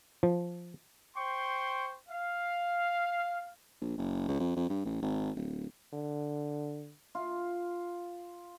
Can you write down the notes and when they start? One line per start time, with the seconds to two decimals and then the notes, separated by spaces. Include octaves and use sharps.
0.23 F3
1.16 C5 G5 C6 C#6
2.09 F5
3.81 A#1
3.97 F#1
4.28 C#2
4.40 F2
4.56 F2
4.69 G2
4.85 A1
5.02 G#1
5.36 D1
5.93 D3
7.15 F4